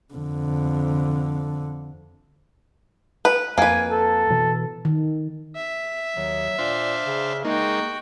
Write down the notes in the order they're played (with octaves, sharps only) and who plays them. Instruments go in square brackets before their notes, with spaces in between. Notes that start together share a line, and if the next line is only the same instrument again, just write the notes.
[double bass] F2 D3
[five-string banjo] B4
[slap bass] F2 [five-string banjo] A#3 B4 [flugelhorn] G#5
[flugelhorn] A4
[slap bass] B2 E3
[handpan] D#3
[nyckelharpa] E5
[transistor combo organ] D#2 [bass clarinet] F#3
[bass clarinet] A#2 [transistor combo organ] D4 C5 F5
[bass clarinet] C#3
[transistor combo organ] G#3 A#3 [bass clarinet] D#4 [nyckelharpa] F#4 G5